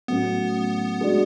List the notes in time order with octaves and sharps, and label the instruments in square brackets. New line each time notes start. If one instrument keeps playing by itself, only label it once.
[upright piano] A2 F#3 C#4 [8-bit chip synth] B3
[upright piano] G#3 D4 F#4